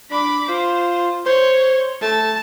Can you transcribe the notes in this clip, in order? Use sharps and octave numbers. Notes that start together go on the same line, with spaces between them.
D4 B5 D6
F4 C5
C5 C#5
A3 A5